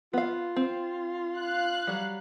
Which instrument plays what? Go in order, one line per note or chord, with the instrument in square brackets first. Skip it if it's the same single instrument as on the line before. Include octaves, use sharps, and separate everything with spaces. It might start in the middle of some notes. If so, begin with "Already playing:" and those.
[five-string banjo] B3 F5 [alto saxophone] F4
[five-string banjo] C4
[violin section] F5 F#6
[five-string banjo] F#3 G3